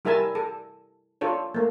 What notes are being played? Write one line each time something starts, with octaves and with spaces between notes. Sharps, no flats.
G3 E4 A#4 E5 G#5 A5
A4
D4 F4 A4 C#5
A3 A#3